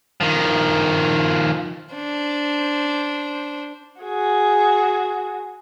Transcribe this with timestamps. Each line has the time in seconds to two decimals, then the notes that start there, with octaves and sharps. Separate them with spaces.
0.21 D#3 F3
1.95 D4 C5
4.01 F#4 G#4